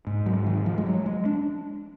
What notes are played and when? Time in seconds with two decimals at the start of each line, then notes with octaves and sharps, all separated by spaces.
0.07 G#2
0.26 F#3
0.46 D#3
0.66 F3
0.78 G#3
0.86 F#3
1.06 G#3
1.25 D4